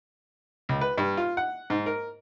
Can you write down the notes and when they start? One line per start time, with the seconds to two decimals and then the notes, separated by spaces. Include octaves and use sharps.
0.69 C#2
0.81 B4
0.98 G2
1.17 F4
1.37 F#5
1.70 G#2
1.86 A#4